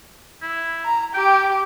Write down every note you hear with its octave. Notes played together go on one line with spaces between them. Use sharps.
E4
A#5
G4 G5